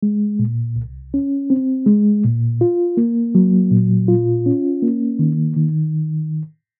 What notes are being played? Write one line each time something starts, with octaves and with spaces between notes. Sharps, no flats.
G#3
A#2
C2
C#4
C4
G#3
A#2
F4
A#3
F#3
A#2
F4
C#4
A#3
D#3
D#3